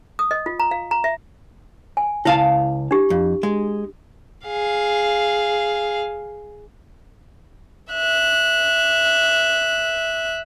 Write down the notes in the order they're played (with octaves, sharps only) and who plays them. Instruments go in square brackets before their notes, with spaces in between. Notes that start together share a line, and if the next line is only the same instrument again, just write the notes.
[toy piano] D#6
D#5
F4
A#5
F5
A#5
E5
G#5
[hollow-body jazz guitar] C#2 F5 A5 [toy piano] E4
[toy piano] D4 G4
[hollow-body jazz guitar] F2
G#3
[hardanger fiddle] G#4 F5
[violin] E5 F#6